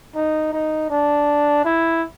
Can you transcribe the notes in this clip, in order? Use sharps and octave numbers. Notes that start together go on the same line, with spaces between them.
D#4
D#4
D4
E4